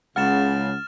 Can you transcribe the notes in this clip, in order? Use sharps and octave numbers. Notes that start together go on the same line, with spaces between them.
C#2 C#3 F#5 F6 A6 E7